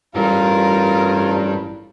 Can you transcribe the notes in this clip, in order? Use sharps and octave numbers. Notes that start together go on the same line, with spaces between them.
A1 G2 G3 F4 A#4